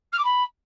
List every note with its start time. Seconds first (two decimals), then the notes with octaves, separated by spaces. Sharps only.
0.12 F6
0.18 D6
0.24 B5